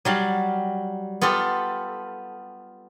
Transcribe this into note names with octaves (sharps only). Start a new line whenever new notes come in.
F#3 G3 F5
B3 F4 G4 A4